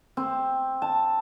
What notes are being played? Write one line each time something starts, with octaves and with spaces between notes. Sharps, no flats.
C4
A5